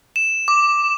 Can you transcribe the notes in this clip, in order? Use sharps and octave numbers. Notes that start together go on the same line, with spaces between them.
E7
D6